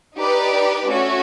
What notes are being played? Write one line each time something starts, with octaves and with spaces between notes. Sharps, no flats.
D#4 G4 B4 D5
A3 C#4 F#4